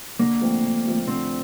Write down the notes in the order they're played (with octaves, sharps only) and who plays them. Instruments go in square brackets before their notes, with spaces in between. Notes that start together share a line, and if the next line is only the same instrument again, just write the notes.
[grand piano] D3 [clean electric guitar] A#3
[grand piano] F3 A3 C4
D3
F3 A3 C4
[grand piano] D3 [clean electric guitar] C4